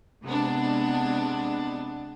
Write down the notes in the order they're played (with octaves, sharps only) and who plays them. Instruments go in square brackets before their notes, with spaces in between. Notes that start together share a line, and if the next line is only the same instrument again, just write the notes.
[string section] C3 G#3 B3 D4